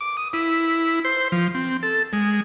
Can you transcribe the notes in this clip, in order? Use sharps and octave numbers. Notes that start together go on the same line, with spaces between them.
D6
D#6
E4
C5
F3
C4
A4
G#3